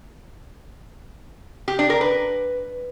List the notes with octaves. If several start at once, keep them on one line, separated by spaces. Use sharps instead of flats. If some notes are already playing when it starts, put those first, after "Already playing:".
G4
D4
A#4
B4